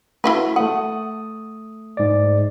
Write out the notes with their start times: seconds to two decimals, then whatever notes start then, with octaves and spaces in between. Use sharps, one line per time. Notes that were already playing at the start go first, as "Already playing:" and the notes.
0.24 A3 E4 F#4 B4
0.56 A3 F#5 D#6
1.97 G#2 D5